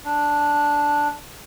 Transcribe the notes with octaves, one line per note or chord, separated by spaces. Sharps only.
D4